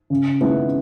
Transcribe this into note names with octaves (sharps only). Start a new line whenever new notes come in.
C#3
G#3 B3 E4